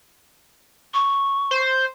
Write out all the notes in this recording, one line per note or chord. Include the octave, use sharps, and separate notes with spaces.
C#6
C5